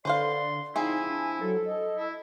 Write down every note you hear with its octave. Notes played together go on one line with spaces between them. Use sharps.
D3 B4 C5 D5 F5 C6
F3 C4 D#4 E4 G#4 G#5
D4
F#3 A4
D#5
E4